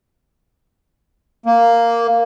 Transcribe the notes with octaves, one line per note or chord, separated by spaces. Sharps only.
A#3